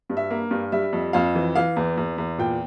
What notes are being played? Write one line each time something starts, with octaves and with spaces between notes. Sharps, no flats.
G2
E5
A#3
G2
G3 E5
F2
F2 F5
E3
E3 F5
E2
E2
E2
A#2 G5